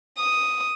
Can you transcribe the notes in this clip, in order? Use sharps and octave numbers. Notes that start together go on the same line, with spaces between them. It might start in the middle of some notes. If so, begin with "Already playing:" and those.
D#6